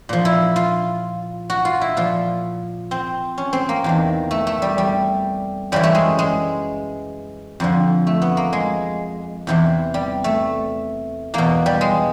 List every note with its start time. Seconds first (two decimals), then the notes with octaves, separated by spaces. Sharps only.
0.09 A#2 F3
0.25 E4
0.56 F4
1.50 F#4
1.65 F4
1.81 E4
1.97 A#2 F3 F4
2.91 C4
3.38 C#4
3.53 C4
3.69 A#3
3.84 E2 C3 D#3
4.31 A3
4.47 A3
4.62 G3
4.78 G3
5.72 F#2 C#3 E3 G3
5.83 A3
5.95 G#3
6.19 G#3
7.60 F2 D3 F3
8.07 A3
8.22 B3
8.37 A#3
8.53 G#3
9.47 E2 C3 E3
9.94 G3
10.24 A3
11.34 E2 B2 A#3
11.66 G3
11.81 G#3